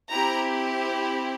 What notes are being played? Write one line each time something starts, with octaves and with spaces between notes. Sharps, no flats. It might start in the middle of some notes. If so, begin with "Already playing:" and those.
C4 E4 G4 A#5